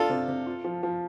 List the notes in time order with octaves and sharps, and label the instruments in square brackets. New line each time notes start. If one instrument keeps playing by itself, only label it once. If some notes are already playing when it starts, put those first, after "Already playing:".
Already playing: [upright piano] D4 [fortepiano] F4 A4
[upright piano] C3
C3
F4
F3
F3